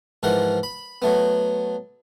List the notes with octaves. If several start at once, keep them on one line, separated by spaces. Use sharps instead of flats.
G#2 E3 F3 A#4 F#5
B5
F#3 A3 B3